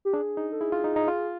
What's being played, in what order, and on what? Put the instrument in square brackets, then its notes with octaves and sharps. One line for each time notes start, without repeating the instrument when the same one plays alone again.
[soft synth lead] G4
[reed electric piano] D4 [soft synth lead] G#4
[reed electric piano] D#4
[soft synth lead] A4
[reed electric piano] E4 [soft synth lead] G#4
[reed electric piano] F4
D#4
D#4
F4